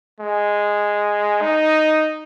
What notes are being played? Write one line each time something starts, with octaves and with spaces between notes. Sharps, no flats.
G#3
D#4